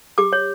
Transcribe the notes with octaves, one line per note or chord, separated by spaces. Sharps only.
G4 D6
C#5